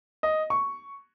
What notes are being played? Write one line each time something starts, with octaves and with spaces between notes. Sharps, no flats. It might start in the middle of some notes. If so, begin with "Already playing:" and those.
D#5
C#6